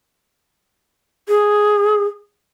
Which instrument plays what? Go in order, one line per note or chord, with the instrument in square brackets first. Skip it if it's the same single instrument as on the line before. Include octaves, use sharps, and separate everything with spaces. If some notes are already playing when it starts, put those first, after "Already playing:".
[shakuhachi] G#4